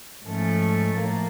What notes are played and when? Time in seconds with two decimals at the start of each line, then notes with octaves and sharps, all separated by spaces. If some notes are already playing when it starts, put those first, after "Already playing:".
0.25 G#2 F3 A3 C#4
0.97 A2 F3 A#3